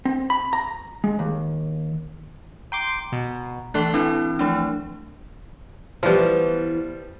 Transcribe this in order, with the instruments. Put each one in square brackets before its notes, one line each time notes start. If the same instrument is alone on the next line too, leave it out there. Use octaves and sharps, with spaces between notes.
[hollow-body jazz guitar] C4
B5
A#5
G#3
D#2
[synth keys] G5 C6 D6 [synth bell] A#5
[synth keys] B2
[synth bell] E3 A4 F#6 [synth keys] A3 D4 C6
[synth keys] E3 [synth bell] C4 D4 E4
[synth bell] F3 A3 D4
[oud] E3 B3 [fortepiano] F3 G3